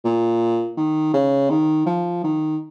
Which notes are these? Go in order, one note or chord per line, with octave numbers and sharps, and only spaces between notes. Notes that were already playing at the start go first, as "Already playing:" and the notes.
A#2
D#3
C#3
D#3
F3
D#3